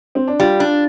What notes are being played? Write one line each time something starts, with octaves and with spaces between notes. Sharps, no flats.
C4
D4
G3 F4
D4